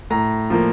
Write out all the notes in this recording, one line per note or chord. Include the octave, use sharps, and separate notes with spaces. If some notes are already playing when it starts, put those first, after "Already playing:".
A2 A#5
F3 A#3